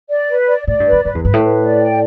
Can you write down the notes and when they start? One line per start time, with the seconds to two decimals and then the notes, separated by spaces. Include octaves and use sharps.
0.10 D5
0.29 B4
0.47 D5
0.67 A2 D5
0.80 G2
0.87 B4
0.92 E2
1.05 G2 B4
1.15 E2
1.24 G2 B4
1.33 A2
1.43 B4
1.62 D5
1.81 G5